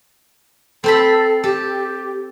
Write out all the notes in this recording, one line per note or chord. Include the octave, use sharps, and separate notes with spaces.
C4 A4 C5 B5
G4 A4